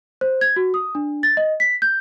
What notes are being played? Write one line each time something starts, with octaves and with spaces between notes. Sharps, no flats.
C5
G#6
F#4
D#6
D4
A6
D#5
B6
G6